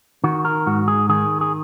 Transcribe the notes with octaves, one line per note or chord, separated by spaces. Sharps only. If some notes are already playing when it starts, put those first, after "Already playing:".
D#3 F#4
A#4
G#2 F#4
G#4
D#3 G#4
G#4